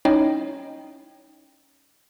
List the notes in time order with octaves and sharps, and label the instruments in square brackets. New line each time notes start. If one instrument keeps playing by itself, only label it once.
[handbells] C#4 D#4 E4 C#5 D#5 G5